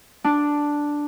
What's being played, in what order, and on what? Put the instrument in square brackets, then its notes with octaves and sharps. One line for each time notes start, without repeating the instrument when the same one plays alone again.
[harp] D4